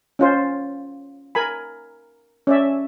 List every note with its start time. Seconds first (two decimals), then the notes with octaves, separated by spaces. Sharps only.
0.19 C#4 F4 C5
1.35 A#4 G#5 B5
2.47 C#4 D5 E5